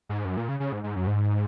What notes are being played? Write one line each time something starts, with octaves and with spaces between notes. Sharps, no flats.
G#2
F#2
A#2
C#3
C#3
G#2
G#2
F#2
G#2